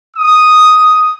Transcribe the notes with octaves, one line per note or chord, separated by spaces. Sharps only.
D#6